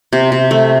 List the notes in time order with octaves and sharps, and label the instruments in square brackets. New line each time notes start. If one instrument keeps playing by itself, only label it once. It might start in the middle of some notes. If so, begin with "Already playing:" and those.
[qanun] C3
C3
A3